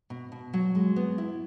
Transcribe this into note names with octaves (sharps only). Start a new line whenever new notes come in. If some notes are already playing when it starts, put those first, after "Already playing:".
B2
B2
F#3
G#3
B3
E4